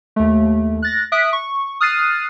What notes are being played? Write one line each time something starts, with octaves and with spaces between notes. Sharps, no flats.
D#2 A3
F#6 A6 A#6
E5 D#6 F#6 B6 D7
C#6
D#6 F6 F#6 A6 C7 D#7